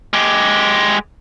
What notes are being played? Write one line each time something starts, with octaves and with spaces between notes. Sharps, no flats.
G#3 G4